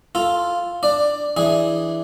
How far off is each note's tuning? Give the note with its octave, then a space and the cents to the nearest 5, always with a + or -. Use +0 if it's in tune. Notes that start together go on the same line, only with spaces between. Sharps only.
F4 +0 A4 +0
D4 +0 D5 +15
E3 +0 D4 +0 G#4 +0